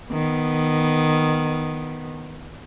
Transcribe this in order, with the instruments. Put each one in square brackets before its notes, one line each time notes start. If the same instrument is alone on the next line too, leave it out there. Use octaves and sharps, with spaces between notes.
[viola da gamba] D#3 B3